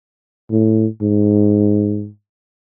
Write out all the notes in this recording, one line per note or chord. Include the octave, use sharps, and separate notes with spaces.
A2
G#2